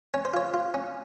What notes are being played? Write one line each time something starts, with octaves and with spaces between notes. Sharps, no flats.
C#4 C#5
C5
F4 C#5
F4
C#4